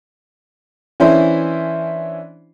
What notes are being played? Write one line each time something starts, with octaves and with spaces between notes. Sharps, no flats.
E3 C#4 D4 E4 C5